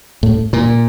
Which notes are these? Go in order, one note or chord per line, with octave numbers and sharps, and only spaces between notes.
A2
A#2